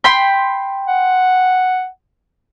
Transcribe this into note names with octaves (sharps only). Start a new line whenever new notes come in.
G5 B5 C6
F#5